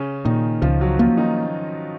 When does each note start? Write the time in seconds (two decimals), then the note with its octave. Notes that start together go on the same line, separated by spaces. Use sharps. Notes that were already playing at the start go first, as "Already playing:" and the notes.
Already playing: C#3 C#4
0.25 A#2 D#3 D#4
0.62 C#2 F3 F4
0.81 F#3 F#4
0.99 F3 A#3 F4
1.17 D#3 D#4